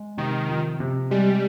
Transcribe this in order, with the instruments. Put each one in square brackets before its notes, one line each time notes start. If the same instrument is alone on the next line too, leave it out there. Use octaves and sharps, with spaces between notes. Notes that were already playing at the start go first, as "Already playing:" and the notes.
Already playing: [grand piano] G#3
[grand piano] C3 [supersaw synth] D#3
[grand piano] F3
C3
[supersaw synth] G3 [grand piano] G#3